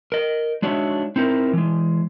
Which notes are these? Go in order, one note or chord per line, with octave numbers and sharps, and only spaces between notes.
A#4 D#5
G#3 D4 D#4 F#4 C#5 E5
C4 D#4 E4 A#4
E3 G#3